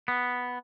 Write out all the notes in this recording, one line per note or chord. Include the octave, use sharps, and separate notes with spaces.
B3